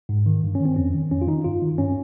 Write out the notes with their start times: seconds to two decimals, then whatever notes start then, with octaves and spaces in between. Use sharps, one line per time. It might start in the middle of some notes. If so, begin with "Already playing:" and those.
0.09 G#2
0.26 D#3
0.43 G2
0.55 C#4
0.60 D#3
0.65 C4
0.76 F2 C#4
0.94 D#3
1.11 F2 C#4
1.22 F4
1.27 D#3 D#4
1.44 G2 F4
1.62 D#3
1.78 G2 C#4